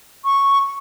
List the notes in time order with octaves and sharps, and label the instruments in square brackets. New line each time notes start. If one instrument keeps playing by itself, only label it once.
[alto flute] C#6